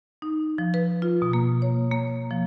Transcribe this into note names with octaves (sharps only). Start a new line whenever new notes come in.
D#4
F3
B4
F4
B2
A#3
C#5
A#3
F3